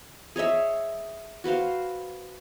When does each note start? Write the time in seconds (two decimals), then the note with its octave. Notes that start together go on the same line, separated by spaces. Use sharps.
0.36 G#4 C#5 D#5 E5
1.44 F#4 B4 C5 F5